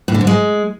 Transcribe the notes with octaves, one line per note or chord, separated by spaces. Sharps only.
A2
D3
G#2
G#3